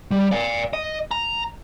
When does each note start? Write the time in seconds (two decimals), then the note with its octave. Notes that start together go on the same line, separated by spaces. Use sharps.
0.11 G3
0.32 D5 F5
0.73 D#5
1.11 A#5